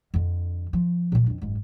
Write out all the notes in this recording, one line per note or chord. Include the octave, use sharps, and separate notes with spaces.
F2 D3
F3
A#2 E3
F2 D4
F#1 G#2